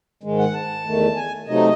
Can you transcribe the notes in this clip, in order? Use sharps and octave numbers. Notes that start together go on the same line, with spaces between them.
G#2 D#3 G#3
F#5
A5
E2 D#3 A3
G#5
C3 F#3 A3 D#4 D#5